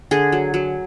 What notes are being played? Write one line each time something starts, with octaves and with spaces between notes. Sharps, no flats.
D3 G#4
F#3
F#3